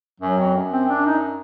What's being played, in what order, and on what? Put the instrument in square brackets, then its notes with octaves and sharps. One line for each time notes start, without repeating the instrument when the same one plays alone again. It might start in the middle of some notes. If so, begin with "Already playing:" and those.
[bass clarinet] F#2 [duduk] F#3
[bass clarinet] F2
F#2
[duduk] C4
D4
D#4